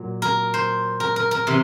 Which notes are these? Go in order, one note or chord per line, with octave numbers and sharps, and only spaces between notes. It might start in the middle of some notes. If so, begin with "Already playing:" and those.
Already playing: A#2 F#3
A#4
C5
A#4
A#4
A#4
C3 E3